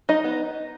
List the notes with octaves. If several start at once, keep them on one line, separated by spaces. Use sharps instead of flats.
D#4 D#5
B3